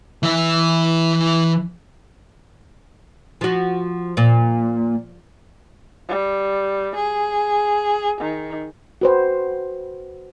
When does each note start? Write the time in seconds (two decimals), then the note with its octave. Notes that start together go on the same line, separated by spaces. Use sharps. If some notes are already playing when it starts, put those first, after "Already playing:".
0.23 E3 E5
3.41 F3 F#4
4.17 A#2
6.08 G3
6.95 G#4
8.21 D#3
9.01 F#4 B4 C5